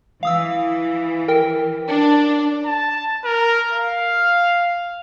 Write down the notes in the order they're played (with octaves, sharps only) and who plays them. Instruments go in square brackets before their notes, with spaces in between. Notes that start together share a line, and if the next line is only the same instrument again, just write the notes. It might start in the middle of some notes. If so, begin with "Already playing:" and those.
[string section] E3 [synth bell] F5 D#6 E6
[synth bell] A#4 G5
[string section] D4
[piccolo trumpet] A5
A#4
F5